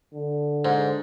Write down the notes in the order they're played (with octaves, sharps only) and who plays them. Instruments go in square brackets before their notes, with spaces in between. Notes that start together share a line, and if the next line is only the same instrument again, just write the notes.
[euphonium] D3
[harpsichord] G#2